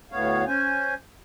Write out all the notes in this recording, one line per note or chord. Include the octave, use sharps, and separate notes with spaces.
D2 A2 B3 C#5 F5
C#4 C5 G#5